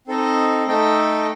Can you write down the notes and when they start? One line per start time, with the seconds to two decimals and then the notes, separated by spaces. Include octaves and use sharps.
0.07 C4 D#4 A4 D#5
0.67 A3 D#4 A4 D#5 G5